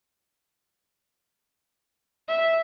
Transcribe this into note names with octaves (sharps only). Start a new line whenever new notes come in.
E5